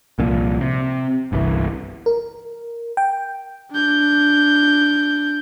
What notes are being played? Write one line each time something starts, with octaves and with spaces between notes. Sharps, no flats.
C2 A#2 F3
C3
G1 C2 C3 E3
A#4
G5
D4 G6